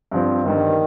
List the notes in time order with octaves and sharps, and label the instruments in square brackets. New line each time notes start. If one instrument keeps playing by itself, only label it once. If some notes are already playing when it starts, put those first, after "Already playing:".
[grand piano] G2 F3 C4
[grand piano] G1 G2 G3 [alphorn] D#3